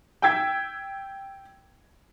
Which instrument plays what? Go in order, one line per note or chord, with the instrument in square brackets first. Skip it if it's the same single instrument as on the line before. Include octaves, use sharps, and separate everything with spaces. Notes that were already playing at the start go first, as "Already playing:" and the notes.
[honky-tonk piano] G5 E6 G#6 B6